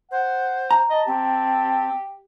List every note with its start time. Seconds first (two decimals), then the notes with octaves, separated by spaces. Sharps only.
0.11 C5 F#5
0.71 A#5
0.90 D#5 A5
1.07 C4 G4